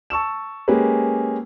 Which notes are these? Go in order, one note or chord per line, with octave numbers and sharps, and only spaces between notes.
A5 C#6 E6 E7
G#3 A#3 C#4 G4 G#4 B4